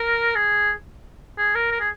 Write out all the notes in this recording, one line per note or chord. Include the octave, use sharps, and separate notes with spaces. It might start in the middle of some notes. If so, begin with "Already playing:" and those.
Already playing: A#4
G#4
G#4
A#4
A#4
G#4